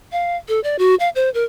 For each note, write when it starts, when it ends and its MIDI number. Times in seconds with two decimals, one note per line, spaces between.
0.12 0.36 77
0.48 0.60 69
0.64 0.77 74
0.79 0.95 66
1.00 1.09 77
1.15 1.30 72
1.34 1.44 70